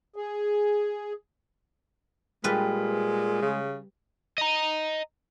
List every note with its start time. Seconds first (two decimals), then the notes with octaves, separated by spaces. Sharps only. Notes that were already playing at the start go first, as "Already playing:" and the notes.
0.16 G#4
2.44 A#2 G3 G#3 B4
3.42 C#3
4.38 D#5 A#5